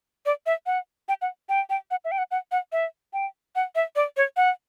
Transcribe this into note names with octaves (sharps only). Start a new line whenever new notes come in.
D5
E5
F#5
G5
F#5
G5
G5
F#5
E5
G5
F#5
F#5
F#5
E5
G5
F#5
E5
D5
C#5
F#5